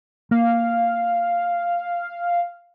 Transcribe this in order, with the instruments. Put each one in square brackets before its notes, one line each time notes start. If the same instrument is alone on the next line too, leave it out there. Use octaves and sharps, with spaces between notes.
[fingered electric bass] A#3 [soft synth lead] F5